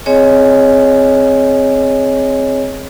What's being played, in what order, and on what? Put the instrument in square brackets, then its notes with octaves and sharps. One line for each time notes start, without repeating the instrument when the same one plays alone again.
[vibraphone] C4 G#4 C#5 D#5 G#5